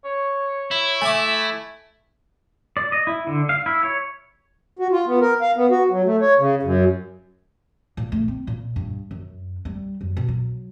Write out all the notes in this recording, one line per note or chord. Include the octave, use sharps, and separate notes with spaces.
C#5
E4
A3 E5 G#5 D6
E5
D5
D#5
E4
D3
F5
E4
C#5
F#4
F4
B3
A#4
F5
B3
F#4
F#3
A3
C#5
C#3
F#2
A#2
A3
C4
A#2
G2
F#2
G3
F#2
B2
F#3